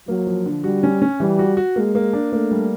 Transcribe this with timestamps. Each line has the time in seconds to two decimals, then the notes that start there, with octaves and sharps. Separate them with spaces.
0.08 F#3 A#3
0.27 F3
0.46 D3
0.64 G3 F#4
0.83 C#4
1.02 C#4
1.20 E3 G3
1.39 F#4
1.57 F#4
1.76 G#3 A#3
1.95 A#3
2.13 D4
2.32 A3 A#3
2.51 G3